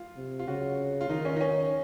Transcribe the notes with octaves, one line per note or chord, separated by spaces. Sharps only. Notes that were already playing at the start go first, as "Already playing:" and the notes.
Already playing: F4
C3
F4
C#3 F#4
F4
D#3 D#4
C#4
D#4
C#4